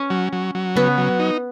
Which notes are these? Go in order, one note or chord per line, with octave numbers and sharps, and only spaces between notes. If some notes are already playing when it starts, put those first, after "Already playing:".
Already playing: C#4
F#3
F#3
F#3
C#3 B3
F#3
D#4